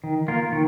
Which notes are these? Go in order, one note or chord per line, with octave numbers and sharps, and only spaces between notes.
D#3
A#3 F4 A#4
D#3